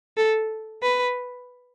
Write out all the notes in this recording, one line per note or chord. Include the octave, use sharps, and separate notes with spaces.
A4
B4